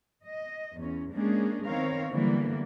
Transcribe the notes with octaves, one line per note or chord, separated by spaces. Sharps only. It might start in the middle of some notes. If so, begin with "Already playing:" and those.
D#5
E2 C#4
G#3 A#3 C#4 D4 G#4
D#3 B3 C4 A#4 C#5 F5
D3 E3 F#3 G3 A#3 B3